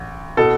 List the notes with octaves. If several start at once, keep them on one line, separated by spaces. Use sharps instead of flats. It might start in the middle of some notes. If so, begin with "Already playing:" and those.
Already playing: A1
B2 A4